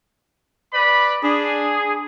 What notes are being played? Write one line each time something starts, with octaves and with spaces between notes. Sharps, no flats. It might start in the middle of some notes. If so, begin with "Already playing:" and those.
B4 D5 B5
D4 G#4